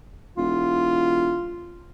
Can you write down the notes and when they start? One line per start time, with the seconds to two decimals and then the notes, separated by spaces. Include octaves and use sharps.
0.38 E1 F4